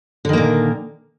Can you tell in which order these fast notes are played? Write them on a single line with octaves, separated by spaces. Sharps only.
D3 D#3 A#3 A#2